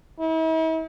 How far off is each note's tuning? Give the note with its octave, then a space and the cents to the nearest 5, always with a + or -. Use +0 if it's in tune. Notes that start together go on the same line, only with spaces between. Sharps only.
E4 -45